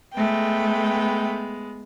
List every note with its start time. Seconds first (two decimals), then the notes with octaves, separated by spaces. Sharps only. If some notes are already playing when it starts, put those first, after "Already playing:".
0.14 G#3 A3 B3 G5